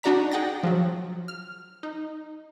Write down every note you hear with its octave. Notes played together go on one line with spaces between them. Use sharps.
D4 D#4 F#4 D5 A#5 B6
G#4 F#5 G5 A6 A#6
F3 F#3
F6
D#4